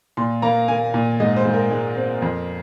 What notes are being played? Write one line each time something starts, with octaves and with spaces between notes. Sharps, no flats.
A#2 C6
A#3 A#5
A#3 G#5
A#2
G#2 D#5
C5
G#2
A#4
G#3
C4
F2